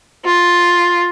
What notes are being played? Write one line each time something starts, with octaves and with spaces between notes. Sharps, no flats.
F4